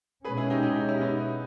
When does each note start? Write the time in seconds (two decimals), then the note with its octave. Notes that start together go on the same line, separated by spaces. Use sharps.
0.25 B2 G#3 C#4 G#4 B4
0.37 E4 G#4
0.50 D#4 G4
0.63 D#4 G4
0.76 D#4 G4
0.88 C#4 E4
1.01 B3 D#4